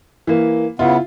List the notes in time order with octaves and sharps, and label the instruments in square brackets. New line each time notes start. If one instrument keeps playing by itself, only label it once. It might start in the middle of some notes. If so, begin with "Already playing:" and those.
[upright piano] E3 A#3
[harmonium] C#3 B3 [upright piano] E4 F4